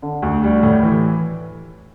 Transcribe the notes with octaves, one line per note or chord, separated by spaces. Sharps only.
D3
D2
G3
A2
E3